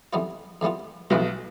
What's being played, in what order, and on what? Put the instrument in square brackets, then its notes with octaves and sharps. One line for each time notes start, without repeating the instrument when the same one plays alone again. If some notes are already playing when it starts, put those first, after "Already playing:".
[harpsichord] F2 E3 G3 B3 F4
F2 E3 G3 B3 F4
[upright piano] B1 B2 [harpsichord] F2 E3 G3 B3 F4